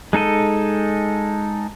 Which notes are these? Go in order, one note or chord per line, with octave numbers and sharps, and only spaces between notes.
G#3 D#4 A4 D#5